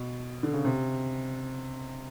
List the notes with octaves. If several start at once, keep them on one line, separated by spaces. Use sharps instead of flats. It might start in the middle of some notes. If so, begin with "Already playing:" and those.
Already playing: B2
D3
C#3
C3